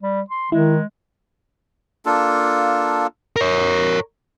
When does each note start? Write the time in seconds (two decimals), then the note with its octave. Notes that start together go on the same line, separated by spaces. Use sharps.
0.03 G3
0.30 C6
0.52 D#3 G#3 E4
2.06 A#3 D4 F4 A4
3.36 A#4 C#5